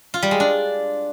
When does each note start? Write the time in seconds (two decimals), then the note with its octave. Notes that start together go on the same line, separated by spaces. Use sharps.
0.14 F4
0.23 G3
0.31 G#3
0.40 D4